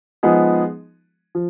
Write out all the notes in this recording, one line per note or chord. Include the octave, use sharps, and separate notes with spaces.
F3 G#3 B3 D#4 G#4
F3